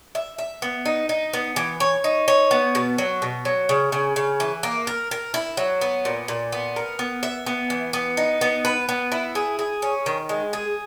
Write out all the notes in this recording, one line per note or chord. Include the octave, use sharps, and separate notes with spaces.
E5
E5
B3
D#4
D#4
B3
E3
C#5
D#4
C#5
B3
B2
F#3
B2
F#3
C#3
C#3
C#3
E3
A#3
A#4
A#4
E4
F#3
B3
A#2
A#2
B3
A#4
B3
E5
B3
E3
B3
D#4
B3
B4
B3
E4
G#4
G#4
C#4
D#3
G#3
G#4